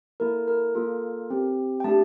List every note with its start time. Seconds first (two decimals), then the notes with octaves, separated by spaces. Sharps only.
0.20 A#3 E4 A4 A#4
0.48 A#4
0.75 A#3 F4 A4
1.30 C4 G4
1.80 G5
1.84 A3 D4 G4 A5